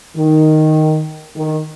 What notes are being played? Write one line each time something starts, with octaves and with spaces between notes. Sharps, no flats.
D#3
D#3